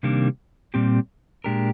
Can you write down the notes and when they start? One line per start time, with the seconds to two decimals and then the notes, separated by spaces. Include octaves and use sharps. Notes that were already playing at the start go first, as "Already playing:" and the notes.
0.03 C3 D#3 G3 A#3 D4
0.74 A#2 G3 C4 G4
1.44 A#2 G#3 D4 G4 A#4